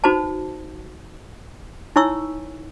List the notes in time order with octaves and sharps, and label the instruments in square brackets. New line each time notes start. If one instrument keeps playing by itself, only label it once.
[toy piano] D#4 F#4 B4 C5 A5
D#4 E4 C#5 G#5 C#6 E6